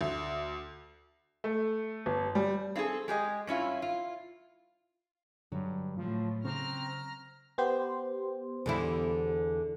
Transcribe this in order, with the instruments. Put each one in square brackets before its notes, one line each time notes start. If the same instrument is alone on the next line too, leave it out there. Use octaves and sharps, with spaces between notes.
[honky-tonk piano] D2
[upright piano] A3
G1
G3
[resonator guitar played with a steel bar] C4 E4 F4 G#4 A4
G#3 G4 G#4 D#5
G2 C#4 E4 F4
F4
[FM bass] G2 [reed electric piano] D3 [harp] F#3
[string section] A2 [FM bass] F3
[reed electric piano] C#3 [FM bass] C4 [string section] A#5 F6 [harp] C#6 D6 F#6
[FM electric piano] B3 G4 C5
[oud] E2 D3 E4